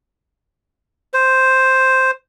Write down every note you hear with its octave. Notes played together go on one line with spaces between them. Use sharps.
C5